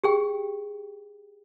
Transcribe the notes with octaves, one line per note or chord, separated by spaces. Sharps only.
G4 G#4 G5